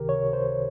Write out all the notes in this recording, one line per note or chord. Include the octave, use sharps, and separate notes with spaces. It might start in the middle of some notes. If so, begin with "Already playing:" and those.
Already playing: C#2 C3 D#3 G4 A#4
C#5
C5